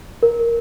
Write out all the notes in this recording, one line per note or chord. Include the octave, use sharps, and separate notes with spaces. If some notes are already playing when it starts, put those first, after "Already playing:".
A#4